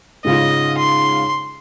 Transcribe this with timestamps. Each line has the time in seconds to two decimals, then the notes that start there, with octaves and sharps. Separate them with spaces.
0.24 G#2 C#3 F4 D#5
0.78 C6